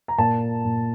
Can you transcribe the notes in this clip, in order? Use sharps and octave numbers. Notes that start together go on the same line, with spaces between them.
A#5
A#2 A5
A#2